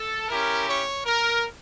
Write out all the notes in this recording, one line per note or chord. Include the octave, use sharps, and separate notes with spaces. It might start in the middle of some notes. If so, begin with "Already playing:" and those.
Already playing: A4
C#4 E4 G4 A#4
C#5
A#4